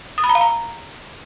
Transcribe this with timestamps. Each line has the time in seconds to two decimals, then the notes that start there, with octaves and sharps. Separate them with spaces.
0.18 D#6
0.24 B5
0.29 A#5
0.35 F5
0.41 A#5